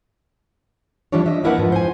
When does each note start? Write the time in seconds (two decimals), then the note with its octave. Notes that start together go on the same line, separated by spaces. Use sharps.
1.12 E3 F3 G3 D4 C#5
1.26 D#5 E5
1.44 A#3 D4 E4 A#4 B4 F#5
1.58 G#2 F3
1.72 C5 G#5